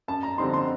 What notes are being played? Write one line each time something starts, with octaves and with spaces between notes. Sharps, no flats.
F#2 A5
A#5
D3 G3 C4 D#4 C6
C6